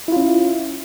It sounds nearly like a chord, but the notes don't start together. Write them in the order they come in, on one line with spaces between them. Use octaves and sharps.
E4 F4 C#4